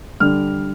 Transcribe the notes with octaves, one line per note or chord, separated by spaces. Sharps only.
D3 G3 F6